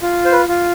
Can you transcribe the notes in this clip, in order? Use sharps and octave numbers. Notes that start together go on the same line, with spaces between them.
F4
C5
B4
F4